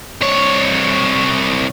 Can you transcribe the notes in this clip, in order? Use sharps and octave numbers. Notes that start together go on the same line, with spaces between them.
C2 C#5